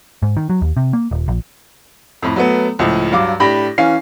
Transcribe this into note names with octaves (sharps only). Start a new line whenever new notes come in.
G#2
D#3
F#3
D#2
C3
A#3
D#1
A#1
F2 A2
F#3 A3 B3
C#2 A2 F3
G2 F#3 F5 D6
A2 D4 G4 B5 A#6
E3 C#4 F5 C7